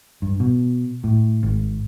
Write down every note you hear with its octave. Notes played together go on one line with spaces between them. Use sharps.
G2
B2
A2
G#1